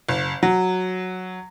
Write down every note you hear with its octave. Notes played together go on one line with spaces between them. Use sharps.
F#1
F#3